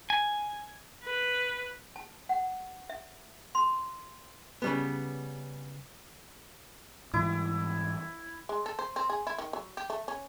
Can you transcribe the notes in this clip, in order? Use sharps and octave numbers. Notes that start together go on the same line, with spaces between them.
G#5
B4
A5
F#5
E5
C6
C#3 G3 B3
G#2 E3 G3 E4
G#3
A4
C5
C4
G#4
E4
D#3
F#3
G4
A3
C#4